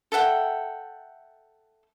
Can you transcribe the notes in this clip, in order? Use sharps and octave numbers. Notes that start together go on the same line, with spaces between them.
A4 E5 F#5 G5